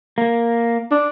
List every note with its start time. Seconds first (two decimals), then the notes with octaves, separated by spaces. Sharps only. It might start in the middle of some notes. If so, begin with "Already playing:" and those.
0.18 A#3
0.91 D4